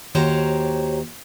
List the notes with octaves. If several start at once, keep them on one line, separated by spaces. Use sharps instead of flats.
D#2 F#4 G4 C5 C#5 A#5